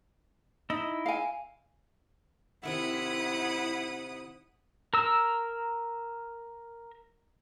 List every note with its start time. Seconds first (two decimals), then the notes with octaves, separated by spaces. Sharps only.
0.70 D#4 E4 D#5 E6
1.06 F5 G#5
2.63 C3 D#3 E4 E5 F#5 D#6
4.94 A#4 E6